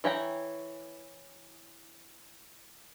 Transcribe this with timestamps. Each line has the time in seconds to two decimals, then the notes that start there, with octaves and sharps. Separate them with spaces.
0.04 E3 C#5 G5 A#5